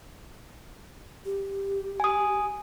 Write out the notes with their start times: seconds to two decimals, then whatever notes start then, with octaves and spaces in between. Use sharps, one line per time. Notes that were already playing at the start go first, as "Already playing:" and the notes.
1.25 G4
2.00 G#5 D#6